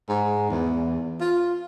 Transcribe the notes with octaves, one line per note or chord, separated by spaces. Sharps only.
G#2
E2
F4